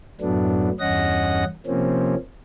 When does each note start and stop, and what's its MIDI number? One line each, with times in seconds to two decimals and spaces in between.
0.21 0.70 42
0.21 0.70 45
0.21 0.70 54
0.21 0.70 57
0.21 0.70 59
0.21 0.70 62
0.80 1.44 40
0.80 1.44 43
0.80 1.44 61
0.80 1.44 75
0.80 1.44 78
0.80 1.44 94
1.66 2.15 48
1.66 2.15 53
1.66 2.15 58
1.66 2.15 60
1.66 2.15 61